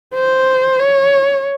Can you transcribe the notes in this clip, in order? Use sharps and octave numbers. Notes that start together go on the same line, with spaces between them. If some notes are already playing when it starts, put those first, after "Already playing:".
C5
C#5